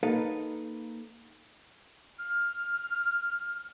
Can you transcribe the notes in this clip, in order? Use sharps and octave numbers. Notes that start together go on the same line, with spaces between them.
A#3 D#4 A4 B4 F5
F6